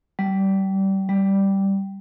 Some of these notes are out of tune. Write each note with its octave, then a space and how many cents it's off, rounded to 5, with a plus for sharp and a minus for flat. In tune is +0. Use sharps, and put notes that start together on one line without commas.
G3 -25
G3 -5